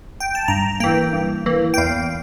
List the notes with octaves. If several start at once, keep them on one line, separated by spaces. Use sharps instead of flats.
G5
A5
G2 A#5
E3 A#3 G5
G2
E3 A#3
G5
E2 F5